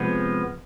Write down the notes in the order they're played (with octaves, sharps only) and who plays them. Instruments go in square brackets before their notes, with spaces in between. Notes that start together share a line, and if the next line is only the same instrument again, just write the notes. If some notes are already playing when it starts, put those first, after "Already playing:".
Already playing: [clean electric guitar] C3 F3 G#3 B3